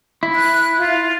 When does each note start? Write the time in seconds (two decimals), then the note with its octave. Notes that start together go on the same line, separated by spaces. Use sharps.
0.23 E4
0.36 F#6
0.78 F4